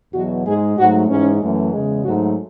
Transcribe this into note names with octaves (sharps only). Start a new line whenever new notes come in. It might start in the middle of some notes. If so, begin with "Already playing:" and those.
E2 B2 F#3 F#4
G#2 G#3 G#4
G#2 F#3 A3 F#4
G#2 E3 G#3 C#4
F#2 E3 A3
E2 C#3 G#3
G#2 F#3 A3 F#4